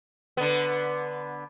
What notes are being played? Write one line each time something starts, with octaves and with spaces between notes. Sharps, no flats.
D3 B3